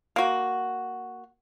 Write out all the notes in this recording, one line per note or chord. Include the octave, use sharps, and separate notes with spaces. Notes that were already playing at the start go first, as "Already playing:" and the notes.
A#3 F#4